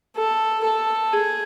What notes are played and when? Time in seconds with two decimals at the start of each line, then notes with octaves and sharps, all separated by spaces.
0.17 A4
0.64 A4
1.13 G#4